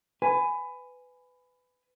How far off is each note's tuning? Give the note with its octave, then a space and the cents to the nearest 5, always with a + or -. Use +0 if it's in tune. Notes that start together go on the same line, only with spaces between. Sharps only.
B4 +20 G#5 +0